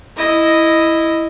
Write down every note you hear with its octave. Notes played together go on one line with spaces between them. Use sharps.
E4 D#5